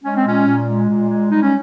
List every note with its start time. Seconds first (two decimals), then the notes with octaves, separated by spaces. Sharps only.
0.04 G#3 C#4
0.16 C4
0.25 A#2 C#4
0.46 A#2
0.66 G#3
0.88 A#2
1.09 G#3
1.29 G3 D#4
1.42 C#4